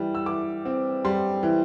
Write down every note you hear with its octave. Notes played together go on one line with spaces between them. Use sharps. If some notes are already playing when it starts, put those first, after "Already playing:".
Already playing: E3 G3
E6
E3 D6
C4
G3 C6
E3